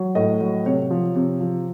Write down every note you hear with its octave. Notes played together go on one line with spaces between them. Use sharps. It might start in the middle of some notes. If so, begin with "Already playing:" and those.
Already playing: F#3
A2 D#5
F#3
C3 C#5
F3
C3
F3